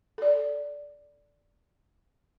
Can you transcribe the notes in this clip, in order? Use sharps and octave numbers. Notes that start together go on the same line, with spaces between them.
A4 D5